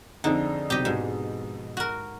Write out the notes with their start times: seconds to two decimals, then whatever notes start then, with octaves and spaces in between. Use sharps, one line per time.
0.24 F2 D3 D#4 G#4 C5 A#5
0.70 B1 C3 G4 D#5
0.85 G#2 B2
1.77 F#4 A#4